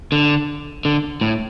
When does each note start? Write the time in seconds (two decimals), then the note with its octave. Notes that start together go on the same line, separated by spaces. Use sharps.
0.12 D3
0.85 D3
1.21 A2